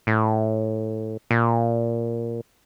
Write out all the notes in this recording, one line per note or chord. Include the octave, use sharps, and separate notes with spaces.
A2
A#2